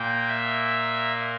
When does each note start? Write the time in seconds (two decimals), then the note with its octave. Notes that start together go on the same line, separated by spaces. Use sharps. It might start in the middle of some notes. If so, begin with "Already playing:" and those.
Already playing: A#2 A#3 G5
0.29 E5